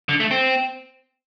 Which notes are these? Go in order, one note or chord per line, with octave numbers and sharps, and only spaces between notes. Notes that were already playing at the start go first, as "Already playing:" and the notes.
D3
A3
C4